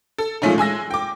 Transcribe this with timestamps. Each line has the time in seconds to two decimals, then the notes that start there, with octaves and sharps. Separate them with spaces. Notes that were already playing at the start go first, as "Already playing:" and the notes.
0.18 A4
0.42 A#2 F3 G#3 A3 C#4 D#4
0.58 G#3 G#5 E6 A#6
0.91 G5 D6